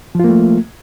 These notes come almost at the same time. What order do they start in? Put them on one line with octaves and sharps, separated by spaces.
F3 F4 A#3 A3